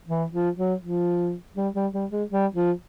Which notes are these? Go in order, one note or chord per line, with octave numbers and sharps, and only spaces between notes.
E3
F3
F#3
F3
G3
G3
G3
G#3
G3
F3